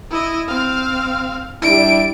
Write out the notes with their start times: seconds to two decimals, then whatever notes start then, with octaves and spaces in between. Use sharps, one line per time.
0.11 E4 D#5
0.48 C4 F5
1.62 G3 D4 E4 D7